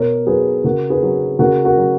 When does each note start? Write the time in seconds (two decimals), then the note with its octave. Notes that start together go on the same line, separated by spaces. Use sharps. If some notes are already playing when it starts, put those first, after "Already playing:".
Already playing: B2 A#4 C#5
0.27 F#3 G#4 B4
0.64 C#3 F#4 A#4
0.90 G#4 B4
1.03 F#3
1.39 C#3 F#4 A#4
1.64 F#4 A#4
1.77 F#3